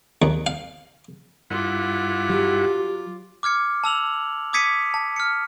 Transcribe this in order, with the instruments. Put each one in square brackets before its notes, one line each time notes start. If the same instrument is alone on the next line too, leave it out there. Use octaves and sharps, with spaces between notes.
[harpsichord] D#2
F5
[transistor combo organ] G2 E4 F#5 [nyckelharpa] F4 D6
[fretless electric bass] F#3 [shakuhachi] G4
[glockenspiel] D6 F6 G#6 C#7
A5 E6 F7 F#7
D6 D#6 G#6 B6 C#7 D#7
A5
F6 C#7